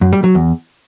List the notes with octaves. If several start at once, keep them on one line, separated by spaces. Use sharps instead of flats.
F#2
G3
F#3
E2